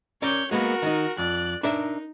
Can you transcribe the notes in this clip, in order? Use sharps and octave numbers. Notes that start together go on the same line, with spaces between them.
C#4 A#4 C#5 D5 G6
G#3 A#3 B3 F#4 A#4
D#3 D#4
F2 D5 F#6
D4 D#4 A#4 E5